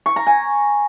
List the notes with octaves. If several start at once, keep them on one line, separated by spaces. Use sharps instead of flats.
C#6
A#5
G#5